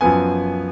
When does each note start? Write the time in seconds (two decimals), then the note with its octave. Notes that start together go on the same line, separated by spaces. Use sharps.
0.01 F#2 F3 B3 G#5